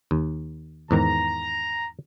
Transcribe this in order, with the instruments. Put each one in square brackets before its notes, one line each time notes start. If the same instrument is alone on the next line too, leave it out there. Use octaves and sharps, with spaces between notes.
[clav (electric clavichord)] D#2
[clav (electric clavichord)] E2 G#2 D#3 [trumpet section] A#5